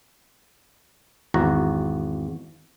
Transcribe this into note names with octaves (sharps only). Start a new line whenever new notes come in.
G#1 E2 F#4 A#5